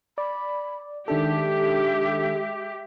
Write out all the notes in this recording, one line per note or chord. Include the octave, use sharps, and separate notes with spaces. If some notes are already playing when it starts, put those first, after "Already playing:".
D5 B5
D#3 G#3 D4 G4 A4 E5